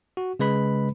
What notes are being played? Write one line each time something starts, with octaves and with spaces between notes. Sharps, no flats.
F#4
C#3 G#3 B4 B5